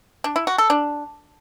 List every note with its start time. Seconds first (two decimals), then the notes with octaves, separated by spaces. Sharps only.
0.24 D4
0.36 E4
0.47 F#4
0.58 A4
0.70 D4